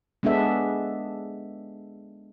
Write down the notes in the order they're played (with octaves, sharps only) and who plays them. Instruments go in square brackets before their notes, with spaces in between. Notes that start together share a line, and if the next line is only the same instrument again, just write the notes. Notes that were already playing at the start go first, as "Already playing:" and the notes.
[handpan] G#3 B3 D4 A4 E5